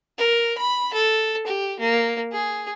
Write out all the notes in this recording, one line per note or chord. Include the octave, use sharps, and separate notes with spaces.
A#4
B5
A4
G4
A#3
G#4